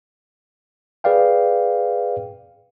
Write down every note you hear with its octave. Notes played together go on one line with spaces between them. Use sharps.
G#4 B4 D5 F5 G5